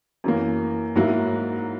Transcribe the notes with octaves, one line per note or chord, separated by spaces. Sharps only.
F#2 E3 A#3
G#2 F#3 A#3 E4